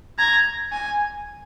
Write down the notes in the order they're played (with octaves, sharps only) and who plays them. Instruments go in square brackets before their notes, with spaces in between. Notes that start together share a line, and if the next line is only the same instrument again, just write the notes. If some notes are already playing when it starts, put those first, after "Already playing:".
[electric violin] A#5 [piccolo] G#6
[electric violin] G#5